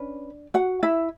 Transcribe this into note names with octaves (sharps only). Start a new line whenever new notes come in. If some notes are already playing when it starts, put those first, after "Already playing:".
Already playing: C#4 D4 B4
F#4 F#5
E4 E5